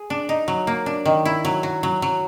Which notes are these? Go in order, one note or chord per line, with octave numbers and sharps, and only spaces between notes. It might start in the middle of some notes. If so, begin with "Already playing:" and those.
Already playing: G#4
D4
D#4
F#3
A#3
D4
D#3
E4
F#3
F#3
F#3
F#3